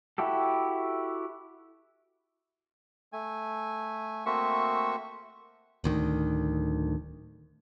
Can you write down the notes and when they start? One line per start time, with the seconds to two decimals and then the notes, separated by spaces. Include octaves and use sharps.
0.18 E4 F#4 G4 A4
3.13 A3 G#5
4.26 A3 A#3 C4 F#4 E5 C#6
5.84 D1 D2 D#3